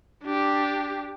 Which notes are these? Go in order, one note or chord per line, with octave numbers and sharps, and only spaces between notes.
D4 G4